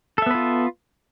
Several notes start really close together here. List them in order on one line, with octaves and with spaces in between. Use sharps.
A4 E5 B3 B4 F4